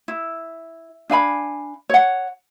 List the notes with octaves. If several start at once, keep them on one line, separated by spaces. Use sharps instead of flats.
E4
D4 F5 G#5 B5
C#5 F#5